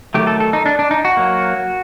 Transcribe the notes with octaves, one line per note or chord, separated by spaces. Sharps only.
D#3 F#3 A3 G4
A4
A4
D#4
D4
D4
D#4
F#4
F#3 A#3